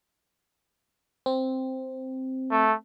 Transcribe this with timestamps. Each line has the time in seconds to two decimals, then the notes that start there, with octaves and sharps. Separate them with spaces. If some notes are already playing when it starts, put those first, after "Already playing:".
1.26 C4
2.51 A3